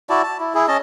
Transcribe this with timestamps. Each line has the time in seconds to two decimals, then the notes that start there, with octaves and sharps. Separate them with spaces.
0.10 E4 F#4 D5 A5
0.23 A5
0.40 E4
0.55 E4 G#4
0.68 C#4 D#5 A5